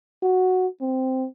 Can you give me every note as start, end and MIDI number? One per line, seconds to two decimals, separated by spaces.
0.23 0.67 66
0.81 1.26 60